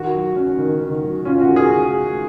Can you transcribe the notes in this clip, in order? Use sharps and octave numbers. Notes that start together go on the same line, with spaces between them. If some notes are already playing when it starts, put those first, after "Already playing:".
Already playing: D#3 F#4
F#3
C#4
D#3
D#3
F#3
C#4 F4
F#4
D#3
G#4